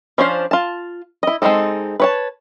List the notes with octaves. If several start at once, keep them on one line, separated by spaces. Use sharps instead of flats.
F3 C#4 D4 C5 F5
F4 A5
E4 D#5
G#3 A#3 C4 D#4 A4
B4 C#5 A5